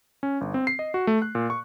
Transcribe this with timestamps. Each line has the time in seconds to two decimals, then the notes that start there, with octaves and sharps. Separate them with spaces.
0.23 C#4
0.41 G1
0.54 C4
0.67 C7
0.79 D#5
0.94 F#4
1.07 A3
1.22 F#6
1.35 A#2
1.50 C#6